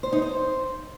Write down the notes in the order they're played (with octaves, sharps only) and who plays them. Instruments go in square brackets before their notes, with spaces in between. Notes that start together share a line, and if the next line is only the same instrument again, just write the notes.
[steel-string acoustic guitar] C5
D#4
C5